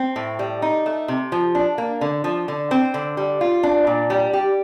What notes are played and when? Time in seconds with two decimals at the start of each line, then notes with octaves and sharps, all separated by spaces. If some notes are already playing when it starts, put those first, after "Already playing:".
Already playing: C4
0.16 A2
0.39 G3
0.62 D#4
0.86 A3
1.08 C3
1.32 F3
1.55 D4
1.78 A#3
2.01 D3
2.24 F3
2.48 D3
2.71 C4
2.94 D3
3.17 G3
3.41 F4
3.63 D4
3.87 A#2
4.10 G3
4.33 G4